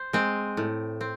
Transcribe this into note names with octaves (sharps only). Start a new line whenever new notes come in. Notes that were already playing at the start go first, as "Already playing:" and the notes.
Already playing: C5
G#3 C4
A2
C4